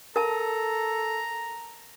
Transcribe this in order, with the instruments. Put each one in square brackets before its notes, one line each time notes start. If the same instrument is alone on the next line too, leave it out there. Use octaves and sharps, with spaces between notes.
[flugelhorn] A4 [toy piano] A#4 A5 [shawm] A#5